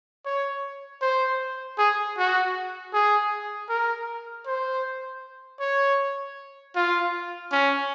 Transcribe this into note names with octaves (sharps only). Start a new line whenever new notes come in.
C#5
C5
G#4
F#4
G#4
A#4
C5
C#5
F4
C#4